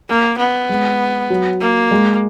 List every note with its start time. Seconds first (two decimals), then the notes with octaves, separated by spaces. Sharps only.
0.09 A#3
0.38 B3
0.69 G#3
1.30 F#3
1.61 A#3
1.91 G#3